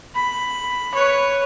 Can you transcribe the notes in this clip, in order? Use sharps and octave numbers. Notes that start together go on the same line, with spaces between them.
B5
B4 C#5